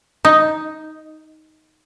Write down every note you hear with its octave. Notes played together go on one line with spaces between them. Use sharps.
D#4